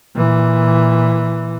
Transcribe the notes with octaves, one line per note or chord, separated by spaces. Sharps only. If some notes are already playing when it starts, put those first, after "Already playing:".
A#2 E3